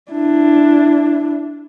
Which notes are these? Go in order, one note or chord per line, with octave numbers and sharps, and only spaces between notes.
D4 E4